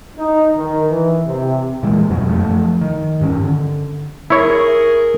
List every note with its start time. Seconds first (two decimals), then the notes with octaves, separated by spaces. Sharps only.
0.17 D#4
0.56 D#3
0.90 E3
1.26 C3
1.83 A#2 E3 G#3
2.10 F2 B2 F#3
2.28 F#2 F3 A3
2.81 D#3
3.21 G2 D#3 C#4
3.44 D3
4.30 E4 G#4 A#4 C#5